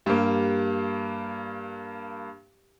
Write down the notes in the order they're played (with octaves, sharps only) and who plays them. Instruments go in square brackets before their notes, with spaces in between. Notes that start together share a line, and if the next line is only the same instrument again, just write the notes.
[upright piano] G2 A#3 [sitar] G4